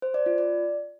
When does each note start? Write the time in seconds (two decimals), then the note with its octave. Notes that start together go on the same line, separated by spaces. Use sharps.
0.02 C5
0.14 D5
0.26 F4
0.38 D5